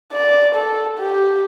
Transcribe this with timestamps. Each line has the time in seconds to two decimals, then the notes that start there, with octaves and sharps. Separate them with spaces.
0.13 D5
0.55 A4
0.98 G4